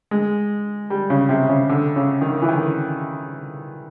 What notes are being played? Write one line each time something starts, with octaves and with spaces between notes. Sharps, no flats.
G#3
G3
C#3
C3
C#3
D3
C#3
D#3
E3
D#3